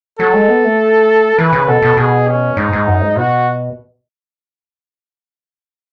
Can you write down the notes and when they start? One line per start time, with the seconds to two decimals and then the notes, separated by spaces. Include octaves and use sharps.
0.19 F#3 A4
0.33 G#3
0.49 B3
0.64 A3
1.38 E3 B4
1.53 C#3
1.68 B2 A4
1.82 B2
1.97 B2 G#4
2.27 C#4
2.57 G#2 D#4
2.73 G#2
2.87 F#2
3.02 G#2
3.16 B2 F#4